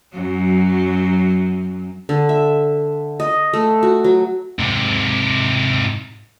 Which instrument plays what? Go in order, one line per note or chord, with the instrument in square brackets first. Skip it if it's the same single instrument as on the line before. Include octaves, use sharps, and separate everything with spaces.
[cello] F#2 F#3
[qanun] D3
E5
D#5
A3
F#4
F#3
[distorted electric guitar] G#2 C3